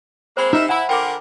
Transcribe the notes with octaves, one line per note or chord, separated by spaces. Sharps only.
G#3 A#3 C4 C5 B5 C6
C3 D#4 A#4 D#5 E5 A#5
E4 F#5 G#5 B5
D3 F4 A#4 G5 D6